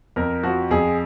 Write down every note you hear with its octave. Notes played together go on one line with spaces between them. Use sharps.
F2 A#4
F3 F#4
F2 G#4